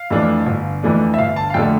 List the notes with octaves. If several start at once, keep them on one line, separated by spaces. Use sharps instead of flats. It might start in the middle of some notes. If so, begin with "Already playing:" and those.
Already playing: F5
F2 E3 A3 D4
G1
F2 E3 A3 D4
E5
G1 F5
A5
F5
F2 D3 A3 G5